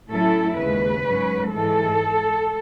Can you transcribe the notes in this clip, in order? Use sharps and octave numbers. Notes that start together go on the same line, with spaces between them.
A2 F#3 C#4 E4 A4
D#2 C#3 G#3 B4
G#2 F#3 C#4
G#2 E3 G#3 A4